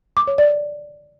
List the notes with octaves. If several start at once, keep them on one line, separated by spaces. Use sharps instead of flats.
D6
C#5
D5